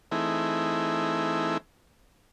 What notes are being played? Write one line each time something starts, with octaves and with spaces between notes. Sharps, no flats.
E3 A3 C4 D#4 E4 G#4